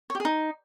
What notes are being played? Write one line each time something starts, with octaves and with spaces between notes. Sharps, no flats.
C#5
G4
G#4
D#4